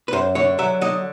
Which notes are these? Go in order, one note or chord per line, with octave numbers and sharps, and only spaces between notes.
B4
F#2 C5
D3 C#5
F#3 E5
D3 D#5